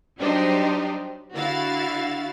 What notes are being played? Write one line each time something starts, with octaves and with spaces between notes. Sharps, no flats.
F#3 G3 D4 D#4 G4 C5
D3 E4 F#4 F5 A6